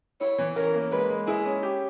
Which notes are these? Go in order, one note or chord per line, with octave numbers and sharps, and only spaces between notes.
E4 C#5
E3
C#4 A#4
A#3
G#3 B4
G#3
E4 G#4
C#4
G4